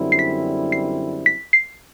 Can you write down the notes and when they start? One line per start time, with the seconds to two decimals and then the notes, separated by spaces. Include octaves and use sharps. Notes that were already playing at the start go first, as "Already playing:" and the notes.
Already playing: F#2 D3 G3 C4 E4
0.12 C7
0.19 B6
0.72 C7
1.26 B6
1.53 C7